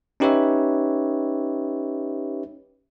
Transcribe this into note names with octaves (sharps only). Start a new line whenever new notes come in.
C#4 D#4 G4 B4 C#5 E5